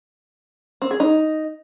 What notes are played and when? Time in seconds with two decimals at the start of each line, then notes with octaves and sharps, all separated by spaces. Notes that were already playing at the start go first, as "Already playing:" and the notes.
0.82 C4
0.91 G#4
1.00 D#4